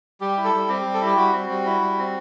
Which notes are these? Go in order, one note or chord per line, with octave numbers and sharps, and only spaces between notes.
G3 G4
E4
A4
G3
C4 G4
G3
A4
E4
G4
G3 F#4
C4
G3
E4
G3
C4